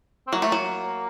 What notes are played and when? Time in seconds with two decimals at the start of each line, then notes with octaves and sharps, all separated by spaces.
0.28 C4
0.33 F#3 A#3
0.42 A3
0.52 F#3